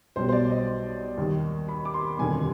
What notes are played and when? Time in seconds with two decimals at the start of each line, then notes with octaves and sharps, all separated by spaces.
0.16 B1 B2 G3 C5
0.29 C5
0.32 D5
0.50 D#5
1.17 D#2 D#3 G3
1.69 B5
1.85 D6
1.94 C6
2.02 B5
2.19 F1 D#2 D3 G3 G#5